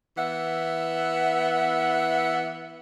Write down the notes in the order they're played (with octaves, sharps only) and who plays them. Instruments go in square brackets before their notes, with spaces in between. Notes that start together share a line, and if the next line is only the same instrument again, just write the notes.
[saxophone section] E3 B3 E5 F#5